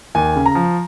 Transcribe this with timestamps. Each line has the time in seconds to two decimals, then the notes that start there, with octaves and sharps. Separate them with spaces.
0.15 D#2 G#5
0.36 C#3
0.46 A#5
0.55 F3